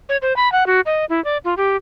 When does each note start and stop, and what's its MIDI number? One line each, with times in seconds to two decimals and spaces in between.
0.09 0.17 73
0.22 0.36 72
0.36 0.51 83
0.52 0.66 78
0.67 0.81 66
0.86 1.05 75
1.09 1.23 64
1.25 1.38 74
1.45 1.54 65
1.57 1.76 67